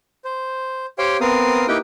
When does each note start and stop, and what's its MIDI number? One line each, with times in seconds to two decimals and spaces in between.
0.25 0.86 72
0.98 1.17 67
0.98 1.17 72
0.98 1.17 73
0.98 1.17 77
0.98 1.17 79
1.21 1.66 59
1.21 1.66 60
1.21 1.66 70
1.21 1.66 77
1.21 1.66 87
1.68 1.78 58
1.68 1.78 63
1.68 1.78 64
1.68 1.78 67
1.68 1.78 71
1.68 1.78 79